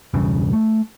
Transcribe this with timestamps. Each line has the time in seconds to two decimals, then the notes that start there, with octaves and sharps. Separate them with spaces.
0.14 B1 E2 G2 C#3
0.53 A3